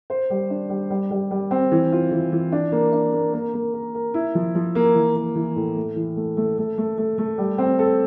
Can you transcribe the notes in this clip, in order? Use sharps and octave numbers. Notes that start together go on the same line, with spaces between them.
C5
G3
D4
G3
G3
G3
G3
C4
E3
F4
E3
E3
D4
A#3
D4
A#3
A#3
A#3
A#4
A#4
E4
F3
F3
A#3
E3
A#3
E3
A2
A3
E3
A3
A3
A3
A3
A3
A3
G3
C4
A4